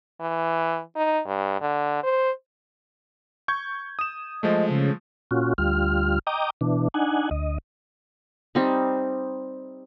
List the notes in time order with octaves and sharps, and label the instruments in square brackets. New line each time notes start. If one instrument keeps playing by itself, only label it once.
[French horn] E3
D#4
G2
D3
C5
[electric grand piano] C#6 G6 G#6
D#6 E7
[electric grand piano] F3 G#3 A3 [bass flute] D#5
[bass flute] C#3
[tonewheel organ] A#2 C#4 F4 F#4
D2 G3 F4 F6
D#5 G5 A#5 D6 D#6
B2 E3 D4
D4 D#4 F#5 G#5
D2 D#5
[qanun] G3 C4 D#4